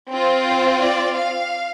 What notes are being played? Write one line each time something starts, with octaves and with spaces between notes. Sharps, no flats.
C4 F4
C5
D5
F5